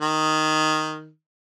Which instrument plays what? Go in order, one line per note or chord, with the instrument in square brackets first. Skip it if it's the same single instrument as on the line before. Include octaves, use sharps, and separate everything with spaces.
[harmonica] D#3